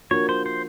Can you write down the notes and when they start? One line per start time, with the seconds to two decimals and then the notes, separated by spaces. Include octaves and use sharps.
0.11 F3 A#3 D4 F#4 A#4 C#5
0.29 C5
0.46 C5